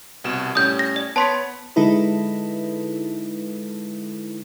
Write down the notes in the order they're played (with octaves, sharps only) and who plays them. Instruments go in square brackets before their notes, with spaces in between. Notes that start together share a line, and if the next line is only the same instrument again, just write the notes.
[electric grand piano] C2 B2 E7
[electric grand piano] A2 G3 C#4 [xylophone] D#6 G6
[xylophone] A#6
D5
[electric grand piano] B3 C#5 [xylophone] A5 C6 B6
[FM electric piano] D3 G#3 D#4 E4 A4 B4